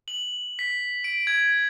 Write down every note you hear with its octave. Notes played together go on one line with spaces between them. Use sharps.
F#7
B6
D7
G#6